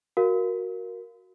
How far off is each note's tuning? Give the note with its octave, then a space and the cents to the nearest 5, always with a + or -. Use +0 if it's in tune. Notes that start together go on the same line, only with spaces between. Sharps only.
F#4 -5 A#4 +0 F5 +0